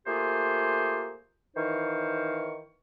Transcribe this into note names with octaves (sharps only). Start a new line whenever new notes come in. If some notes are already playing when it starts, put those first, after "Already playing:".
A3 A#3 F4 G4 G#4 C5
D#3 E3 D#4 C5 F5 C#6